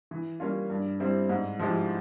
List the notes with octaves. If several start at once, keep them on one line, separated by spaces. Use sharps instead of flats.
E3
G3 A#3 C#4 F4
G2
G3 C4 E4
G#2
F3 G#3 E4 G4